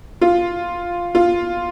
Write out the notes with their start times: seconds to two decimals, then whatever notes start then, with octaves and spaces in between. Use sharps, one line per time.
0.21 F4
1.15 F4